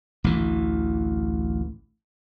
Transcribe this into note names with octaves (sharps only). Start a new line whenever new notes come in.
A1 D2 E3